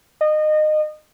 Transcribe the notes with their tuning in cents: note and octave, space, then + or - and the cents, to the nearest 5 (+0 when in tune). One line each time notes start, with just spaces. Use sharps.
D#5 -25